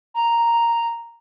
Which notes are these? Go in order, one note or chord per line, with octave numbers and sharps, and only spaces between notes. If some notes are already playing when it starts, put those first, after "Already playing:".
A#5